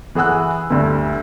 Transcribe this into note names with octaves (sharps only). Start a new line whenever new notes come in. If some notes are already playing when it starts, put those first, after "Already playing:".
E3 G#4 F#5 E6 F#6
D2 G2